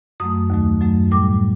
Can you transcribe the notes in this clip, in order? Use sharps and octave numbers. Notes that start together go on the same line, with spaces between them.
F#2 F#3 A3 D#6
D#2 D#3 F#3 A3
F#2 F#3 A3
A2 G3 D6